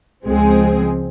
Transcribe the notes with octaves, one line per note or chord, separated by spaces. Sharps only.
C#2 F3 G#3 C4 G#4